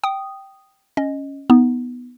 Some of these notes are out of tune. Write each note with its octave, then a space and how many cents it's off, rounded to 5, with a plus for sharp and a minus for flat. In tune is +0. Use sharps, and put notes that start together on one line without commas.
G5 -10 D#6 -5
C#4 +0 D#5 +0
B3 +0 D#4 +20